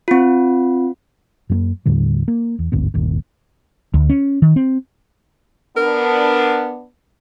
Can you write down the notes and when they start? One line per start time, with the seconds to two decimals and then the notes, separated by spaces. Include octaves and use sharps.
0.08 C4 F4
1.50 F#2 A3 A#3
1.86 D#2 A2 D3 G3
2.28 A#3
2.59 E2
2.72 G#1 D2 G2 B3
2.94 G1 D#2 A#2
3.94 D2
4.10 C#4
4.42 D#3
4.56 C4
5.77 B3 D4 A#4